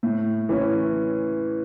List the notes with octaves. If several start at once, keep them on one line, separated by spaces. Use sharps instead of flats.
A2
E3 C#4